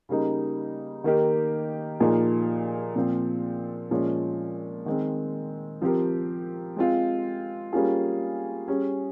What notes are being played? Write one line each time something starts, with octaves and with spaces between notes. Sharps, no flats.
C#3 G3 A#3 D#4
D#3 A#3 D#4 G4 A#4
A#2 F3 A#3 D#4 G#4
A#2 F3 C4
A#2 F3 G#3 C#4
D#3 G#3 C4
F3 C4 G4 A#4
G#3 C4 F4
G3 A#3 C#4 F4 G#4
G3 C#4 G#4